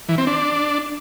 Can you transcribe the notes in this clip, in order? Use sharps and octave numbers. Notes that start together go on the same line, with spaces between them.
E3
C4
D4